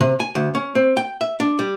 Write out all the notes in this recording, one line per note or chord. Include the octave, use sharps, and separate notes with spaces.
C3
G#5
D2
C#4
C4
G5
E5
D4
G3